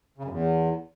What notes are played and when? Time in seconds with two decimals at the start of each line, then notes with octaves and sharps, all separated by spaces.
0.18 C#3
0.25 F#2
0.31 E2